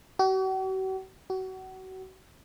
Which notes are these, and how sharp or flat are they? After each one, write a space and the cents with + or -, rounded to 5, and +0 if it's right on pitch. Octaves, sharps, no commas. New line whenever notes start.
F#4 +45
F#4 +30